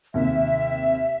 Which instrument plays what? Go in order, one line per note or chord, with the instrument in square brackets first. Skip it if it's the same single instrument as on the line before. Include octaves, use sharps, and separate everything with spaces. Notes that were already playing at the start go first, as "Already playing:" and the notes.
[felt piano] D#2 C3 [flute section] E5